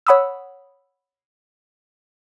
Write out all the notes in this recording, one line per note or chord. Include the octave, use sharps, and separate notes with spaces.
C#5 F#5 B5 D#6 E6